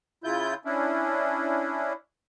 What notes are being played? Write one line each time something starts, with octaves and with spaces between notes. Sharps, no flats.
C#3 E4 F4 G6
C#4 D4 E4